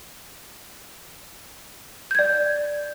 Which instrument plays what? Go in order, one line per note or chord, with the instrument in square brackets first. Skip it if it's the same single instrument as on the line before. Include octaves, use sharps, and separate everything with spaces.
[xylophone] G6
G#6
D5